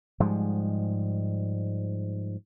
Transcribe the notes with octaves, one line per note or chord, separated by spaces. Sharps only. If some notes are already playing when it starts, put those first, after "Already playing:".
G#2 F3 G3 G#3